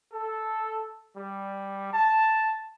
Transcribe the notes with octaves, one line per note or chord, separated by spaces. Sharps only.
A4
G3
A5